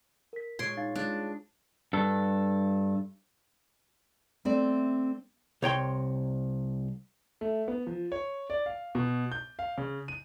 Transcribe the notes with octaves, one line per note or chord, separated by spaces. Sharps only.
A#4 B6
A#2 G#3 C#5 C6 G#6 C7 D7
D#4 F5 A6
G#3 D4 F4
G2 A4
A3 C4 D5
C2 C#5 G5 C6
A3
B3
F3
C#5
D5
F5
B2
G6
F5
C#3
D#7